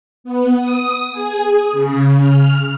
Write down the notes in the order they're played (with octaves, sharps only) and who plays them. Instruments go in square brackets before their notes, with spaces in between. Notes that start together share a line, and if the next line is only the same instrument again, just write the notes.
[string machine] B3
D#6
G#4
C#3
F6